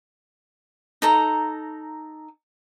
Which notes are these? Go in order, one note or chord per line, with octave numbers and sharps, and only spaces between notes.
D#4 A4 A#5